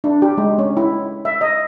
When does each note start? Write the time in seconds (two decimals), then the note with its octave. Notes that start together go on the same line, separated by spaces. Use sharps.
0.04 D4
0.22 G4
0.38 G#3
0.59 C#4
0.77 E4
1.25 E5
1.41 D#5